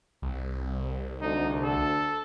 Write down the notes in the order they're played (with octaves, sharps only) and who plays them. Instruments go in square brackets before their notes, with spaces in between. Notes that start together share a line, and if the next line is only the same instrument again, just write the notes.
[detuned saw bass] C2
[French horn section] D2 D3 [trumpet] D#4
[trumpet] A4